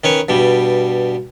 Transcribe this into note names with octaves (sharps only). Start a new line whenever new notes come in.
D#3 C#4 B4 C#5
G2 B2 G3